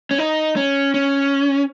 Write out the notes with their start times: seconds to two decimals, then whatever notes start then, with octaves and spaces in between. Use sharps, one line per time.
0.11 C#4
0.18 D#4
0.56 C#4
0.94 C#4